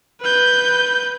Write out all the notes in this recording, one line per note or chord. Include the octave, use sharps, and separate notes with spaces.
B4 G6